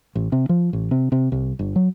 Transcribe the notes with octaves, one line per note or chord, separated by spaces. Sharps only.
A1
C3
F3
A1
C3
C3
C2
G1
F#3